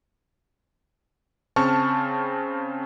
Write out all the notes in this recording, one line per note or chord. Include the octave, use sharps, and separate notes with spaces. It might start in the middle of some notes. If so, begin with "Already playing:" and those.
C#3 C4 A5 C#6 F6